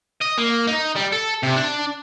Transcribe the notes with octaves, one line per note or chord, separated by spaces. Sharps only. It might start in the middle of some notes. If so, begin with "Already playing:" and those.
D#5
A#3
D#4
G3
A4
C3
D4